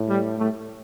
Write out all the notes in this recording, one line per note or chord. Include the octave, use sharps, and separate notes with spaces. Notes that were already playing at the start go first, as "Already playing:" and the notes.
Already playing: A2
G3
A2 A3